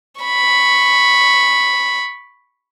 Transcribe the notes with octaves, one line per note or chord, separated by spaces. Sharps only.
B5 C#6